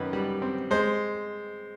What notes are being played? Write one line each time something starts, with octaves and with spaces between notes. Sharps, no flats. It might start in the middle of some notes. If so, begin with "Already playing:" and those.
Already playing: F#2 D#3 B4
G3
C4
G#3 C5